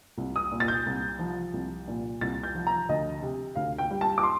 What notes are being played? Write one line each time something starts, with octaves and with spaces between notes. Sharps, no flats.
C2
D#6
A#2
A6
G6
C2
F3
C2
A#2
C2 A6
G6
F3
A#5
D2 D#5
C3
D2 F5
G5
G3
A5
D6
C6